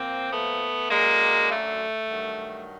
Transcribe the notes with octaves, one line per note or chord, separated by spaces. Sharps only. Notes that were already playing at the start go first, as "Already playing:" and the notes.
Already playing: A#2 F3 A#3 C4
A3 B3
F#2 D3 F#3 G#3 A#3
A3
G2 D#3 F#3